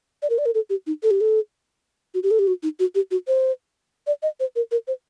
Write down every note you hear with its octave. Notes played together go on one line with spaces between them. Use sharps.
D5
A#4
D5
A#4
A4
G4
D#4
A4
G4
A4
F#4
G4
A4
G4
F#4
D#4
F#4
G4
F#4
C5
D5
D#5
C5
A#4
A#4
C5